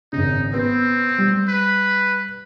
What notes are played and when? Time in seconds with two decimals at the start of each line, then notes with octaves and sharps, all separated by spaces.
0.13 G#1 C#3 D#4
0.54 B3 C4
1.18 G3
1.48 B4